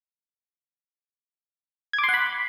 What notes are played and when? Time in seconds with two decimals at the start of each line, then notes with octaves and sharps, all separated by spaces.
1.93 G#6
1.98 D6
2.04 C6
2.09 F#5
2.14 B5